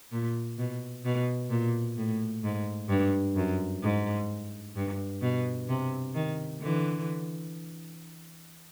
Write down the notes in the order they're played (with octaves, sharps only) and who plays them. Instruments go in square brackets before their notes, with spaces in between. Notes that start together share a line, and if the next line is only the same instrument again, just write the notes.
[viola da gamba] A#2
B2
B2
A#2
A2
G#2
G2
F#2
G#2
G2
B2
C3
D#3
D3 E3